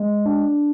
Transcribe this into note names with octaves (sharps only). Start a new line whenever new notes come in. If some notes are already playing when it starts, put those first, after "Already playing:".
Already playing: G#3
D4